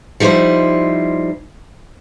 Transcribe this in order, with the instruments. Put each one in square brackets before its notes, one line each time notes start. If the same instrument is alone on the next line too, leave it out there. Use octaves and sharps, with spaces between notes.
[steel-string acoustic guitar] F3 G3 D#4 E4 C5